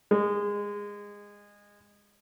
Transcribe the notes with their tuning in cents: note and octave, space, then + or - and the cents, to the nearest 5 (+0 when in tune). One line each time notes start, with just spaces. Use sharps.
G#3 -20